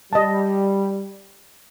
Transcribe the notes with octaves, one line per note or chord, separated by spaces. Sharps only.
G3 D#5 A5